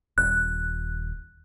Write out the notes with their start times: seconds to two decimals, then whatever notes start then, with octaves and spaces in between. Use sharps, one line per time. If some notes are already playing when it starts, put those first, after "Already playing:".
0.18 D#1 F#6